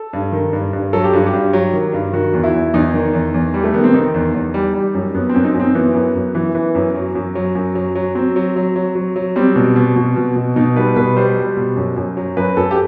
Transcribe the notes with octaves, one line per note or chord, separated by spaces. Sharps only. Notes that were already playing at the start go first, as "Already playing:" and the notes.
Already playing: A4
G2
D#3
G2
G2
F#3 A4
G4
G2 F#4
G4
G2
F#3
D#3
G2
D#3 F#4
E2
E4
E2
E2 D#4
D#3
E2
E2
G3
A3
D#3 B3
C4
D#3 D#4
E2
E2
G3
G3
F#2
F#2 B3
C4
F#2
D#4
F#2
C4
E3 B3
F#2
F#2
E3
E3
F#2
F#3
F#2
F#3
F#2
F#3
F#3
F#3 C4
F#3
F#3
F#3
F#3
F#3
G3 C4
B2
B2
B2
B2
B2
B2 D#4
G3 B4
B2 B4
G3 C5
G3
B2
F#2
F#2
F#3
F#2 B4
F#2 A4
G4